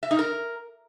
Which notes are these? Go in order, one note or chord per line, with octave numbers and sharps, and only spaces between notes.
E5
D#4
A#4